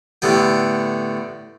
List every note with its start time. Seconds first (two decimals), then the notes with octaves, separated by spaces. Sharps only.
0.22 A2 D3 B3 G4